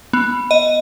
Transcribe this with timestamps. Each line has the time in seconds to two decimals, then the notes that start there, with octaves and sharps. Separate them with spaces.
0.13 B3
0.51 D#5